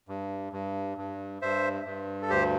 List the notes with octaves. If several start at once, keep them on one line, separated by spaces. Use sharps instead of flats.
G2
G2
G2
G2 C5 E5
G2
A4
D2 G4 C5